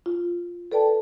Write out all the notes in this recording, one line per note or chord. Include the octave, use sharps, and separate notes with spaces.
F4
A4 B4 D5 G5 A5